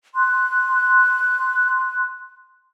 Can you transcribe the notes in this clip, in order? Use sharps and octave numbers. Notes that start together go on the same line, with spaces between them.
C6 F#6